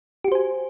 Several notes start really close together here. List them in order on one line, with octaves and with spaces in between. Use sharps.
G4 F#4 C5 G#5